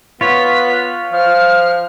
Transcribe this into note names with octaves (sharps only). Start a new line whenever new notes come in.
B3 F4 C#5 B6
F3 F6